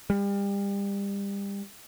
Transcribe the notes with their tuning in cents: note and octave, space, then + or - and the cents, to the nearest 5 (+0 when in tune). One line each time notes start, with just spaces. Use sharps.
G3 +30